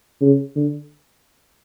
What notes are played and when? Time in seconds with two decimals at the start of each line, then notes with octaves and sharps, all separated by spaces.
0.21 C#3
0.56 D3